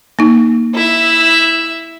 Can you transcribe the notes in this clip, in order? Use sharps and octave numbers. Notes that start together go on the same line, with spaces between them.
A#3 D#4
E4 E5